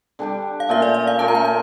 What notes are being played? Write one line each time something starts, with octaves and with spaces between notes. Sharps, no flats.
D3 G3 D4 G4
F5
A#2 A3 C#4 F4 E5
D5
D5
F5
A#2 A3 C#4 F4 A5
A#5
A5
A#5